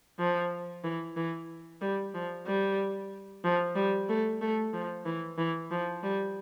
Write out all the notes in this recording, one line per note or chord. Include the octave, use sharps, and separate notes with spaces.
F3
E3
E3
G3
F3
G3
F3
G3
A3
A3
F3
E3
E3
F3
G3